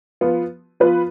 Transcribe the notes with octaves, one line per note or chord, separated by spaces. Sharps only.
F3 B3 F4
F3 B3 F4 B4